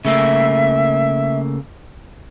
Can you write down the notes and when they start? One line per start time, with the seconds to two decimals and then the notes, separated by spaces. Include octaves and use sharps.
0.05 C#3 A3 A#3 E5